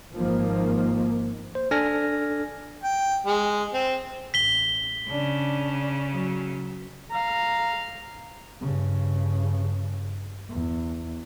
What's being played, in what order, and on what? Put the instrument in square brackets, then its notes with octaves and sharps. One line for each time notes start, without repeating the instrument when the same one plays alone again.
[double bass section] G#1 D#3 F3 A#3
[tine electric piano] C5
D4 A4 D5 G#5 F6 A#6
[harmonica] G5
G#3
C4
[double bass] A1 [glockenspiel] B6 G7
[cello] C#3 [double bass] D4
[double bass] F#3
[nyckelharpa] F5 A#5
[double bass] G2 C#3
E2